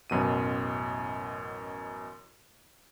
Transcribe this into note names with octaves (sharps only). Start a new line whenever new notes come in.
A1 F#2 B2 D#7